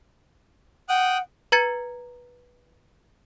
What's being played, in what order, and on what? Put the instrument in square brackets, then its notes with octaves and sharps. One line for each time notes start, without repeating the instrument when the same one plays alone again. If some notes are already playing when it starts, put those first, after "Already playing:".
[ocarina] F#5 [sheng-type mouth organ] G5 D#6 F#6
[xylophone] B4 A#5 G#6 A6 C#7